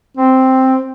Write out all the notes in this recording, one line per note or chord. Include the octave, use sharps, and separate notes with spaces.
C4